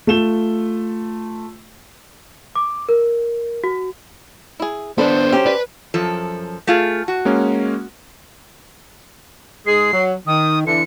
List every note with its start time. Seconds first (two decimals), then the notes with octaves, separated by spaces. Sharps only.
0.07 A3 F4 E7 G7
2.55 D6
2.89 A#4
3.64 F#4
4.60 E4 G#4
4.98 B3 D4 A4 C5 D5 B5
5.32 F#3 C4 C#4 G4
5.46 B4 D5 A5
5.94 F#2 F3 A4
6.67 A3 F4 G#4
7.08 F#4
7.25 G#3 A#3 C#4
9.67 G#2 G#3 G#4 C7
9.92 F#3
10.27 D#3 D#6
10.67 D3 E3 C#7